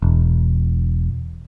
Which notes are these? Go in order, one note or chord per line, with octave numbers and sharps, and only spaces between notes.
E1